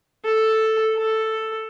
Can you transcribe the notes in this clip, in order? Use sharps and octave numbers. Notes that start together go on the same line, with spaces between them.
A4
A4